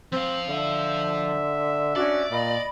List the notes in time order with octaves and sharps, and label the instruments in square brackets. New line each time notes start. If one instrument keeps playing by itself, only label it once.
[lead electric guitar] F3 F5 [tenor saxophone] C4
[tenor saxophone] D3 [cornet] E5
[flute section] C#4 F#4 [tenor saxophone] D4 [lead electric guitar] D5
[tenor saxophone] A#2 [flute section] D#5 B5